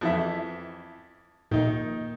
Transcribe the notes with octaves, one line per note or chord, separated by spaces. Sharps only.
F2 E3 E5
A#2 D#3 D#4